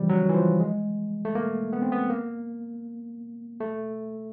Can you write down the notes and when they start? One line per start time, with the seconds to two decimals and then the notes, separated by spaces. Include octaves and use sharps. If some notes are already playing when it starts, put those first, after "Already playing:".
Already playing: C#3 E3 F3 G3
0.09 F#3
0.29 E3
0.34 F3
0.60 G#3
1.25 A3
1.35 A#3
1.73 B3
1.82 C4
1.92 B3
2.10 A#3
3.61 A3